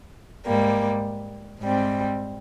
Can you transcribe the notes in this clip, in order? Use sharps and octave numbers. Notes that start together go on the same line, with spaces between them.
G#2 G3 A#3
G#2 G3 C4